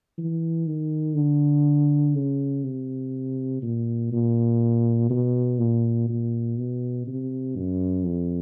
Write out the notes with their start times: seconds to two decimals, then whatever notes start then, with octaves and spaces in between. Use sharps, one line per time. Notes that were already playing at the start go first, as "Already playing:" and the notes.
0.18 E3
0.67 D#3
1.16 D3
2.15 C#3
2.64 C3
3.62 A#2
4.12 A#2
5.10 B2
5.59 A#2
6.09 A#2
6.58 B2
7.07 C3
7.56 F#2
8.05 F2